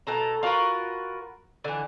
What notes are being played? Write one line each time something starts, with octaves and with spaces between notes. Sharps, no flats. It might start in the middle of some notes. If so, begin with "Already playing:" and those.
B2 A4 A#5
F4 F#4 A#4 B4
D3 E3